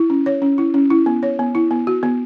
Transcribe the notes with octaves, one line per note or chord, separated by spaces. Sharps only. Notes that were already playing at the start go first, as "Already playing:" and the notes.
Already playing: E4
C#4
C#5
C#4
E4
C#4
E4
B3
C#5
B3
E4
B3
F#4
B3